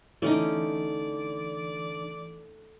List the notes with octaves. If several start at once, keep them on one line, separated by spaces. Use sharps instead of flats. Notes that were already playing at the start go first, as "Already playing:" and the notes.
D3 E3 A3 C#4 D#4 D5